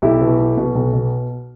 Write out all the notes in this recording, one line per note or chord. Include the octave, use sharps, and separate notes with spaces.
B1 E4 G4
B2
B1
B2
B1
B2